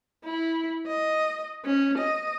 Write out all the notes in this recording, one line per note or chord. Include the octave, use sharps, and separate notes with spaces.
E4
D#5
C#4
D#5